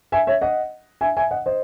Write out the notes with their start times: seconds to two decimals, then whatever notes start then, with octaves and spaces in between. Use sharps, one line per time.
0.12 E5 G#5
0.27 C#5 E5
0.41 D#5 F#5
1.01 E5 G#5
1.17 E5 G#5
1.31 D#5 F#5
1.46 C5 D#5